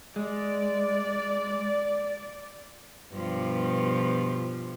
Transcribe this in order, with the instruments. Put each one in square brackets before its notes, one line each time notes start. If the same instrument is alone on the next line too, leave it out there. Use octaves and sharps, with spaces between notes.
[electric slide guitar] G#3 [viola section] D5
[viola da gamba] G2 B2 F3